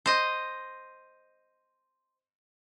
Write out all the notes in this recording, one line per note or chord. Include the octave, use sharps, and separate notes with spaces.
C5 D#5